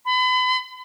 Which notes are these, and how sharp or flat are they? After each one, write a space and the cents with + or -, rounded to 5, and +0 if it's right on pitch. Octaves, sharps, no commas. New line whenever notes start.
B5 +35